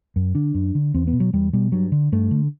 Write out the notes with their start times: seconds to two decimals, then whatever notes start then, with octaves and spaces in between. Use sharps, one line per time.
0.16 F#2
0.35 D3 D4
0.55 F#2
0.75 D3
0.94 E2 C4
1.07 B3
1.13 B2
1.20 F#3
1.33 E2 G3
1.53 B2 G3
1.72 G2 F#3
1.92 D3
2.12 G2 A3
2.31 D3